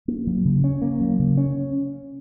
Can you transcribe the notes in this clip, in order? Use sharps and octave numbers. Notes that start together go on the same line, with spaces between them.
A#3
F#3
C#3
C#4
A#3
F#3
C#3
C#4